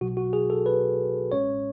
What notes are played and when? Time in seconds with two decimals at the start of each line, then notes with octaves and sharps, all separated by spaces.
0.01 B1 B2 F#3 F#4
0.17 F#4
0.33 G#4
0.50 A4
0.66 B4
1.32 A1 A2 G#3 C#4 C#5